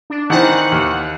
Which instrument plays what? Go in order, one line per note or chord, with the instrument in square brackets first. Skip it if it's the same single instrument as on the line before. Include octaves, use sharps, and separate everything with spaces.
[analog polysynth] D4
[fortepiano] D#3 E3 C4 [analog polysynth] F#5
[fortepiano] D#2